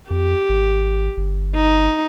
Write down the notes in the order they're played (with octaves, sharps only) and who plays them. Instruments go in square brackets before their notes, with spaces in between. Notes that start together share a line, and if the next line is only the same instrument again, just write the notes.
[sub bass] F2 [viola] G4
[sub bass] G#1
G1
[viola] D#4